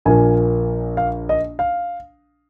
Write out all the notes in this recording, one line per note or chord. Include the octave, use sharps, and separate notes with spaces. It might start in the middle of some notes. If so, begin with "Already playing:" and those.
A#1 A#2 F3 A#3 G#5
F5
D#5
F5